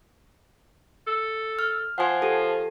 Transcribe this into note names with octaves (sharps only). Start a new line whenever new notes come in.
A4
F6
F3 F#5 G#5
G4 A4